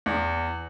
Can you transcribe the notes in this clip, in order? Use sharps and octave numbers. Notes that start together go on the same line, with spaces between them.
E2